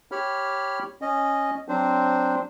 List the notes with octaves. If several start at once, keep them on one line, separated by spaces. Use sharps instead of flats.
G4 C#5 B5 F6
C#4 D#5
F#3 C4 D4 C5